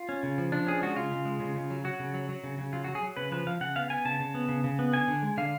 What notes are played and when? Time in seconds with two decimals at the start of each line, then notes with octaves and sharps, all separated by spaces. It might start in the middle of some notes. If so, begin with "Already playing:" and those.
Already playing: F4
0.09 C#4
0.23 C#3
0.38 F3
0.52 F3 D4
0.67 C#4 G#4
0.82 G#3 F#4
0.96 C#3 F4
1.11 C#3
1.25 G#3
1.40 C#3
1.55 C#3
1.70 F#3
1.84 F#3 F#4
2.00 C#3
2.14 F#3
2.29 F#3
2.44 C#3
2.58 C#3
2.73 F#3 F4
2.84 F#3 F#4
2.95 G#4
3.03 F#3
3.17 C#3 B4
3.32 F3 B4
3.47 F3 F5
3.61 C#3 F#5
3.76 B3 F5
3.90 B3 G#5
4.05 C#3 A5
4.20 C#3
4.35 B3
4.49 C#3
4.64 C#3
4.79 B3
4.93 D3 G#5
5.08 D3
5.23 G#3
5.37 D3 F5